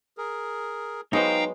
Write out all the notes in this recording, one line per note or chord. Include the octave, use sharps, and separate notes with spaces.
G#4 A#4
F#3 G#3 B3 D#4 C5 F5 G5 A#5